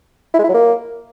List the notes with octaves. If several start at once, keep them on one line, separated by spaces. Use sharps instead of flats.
E4
G#3
E4
F#3
A#3